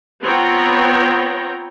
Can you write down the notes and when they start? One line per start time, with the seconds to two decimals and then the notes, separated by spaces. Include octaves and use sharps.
0.23 B3 C4 F4 C#5 G5 A#5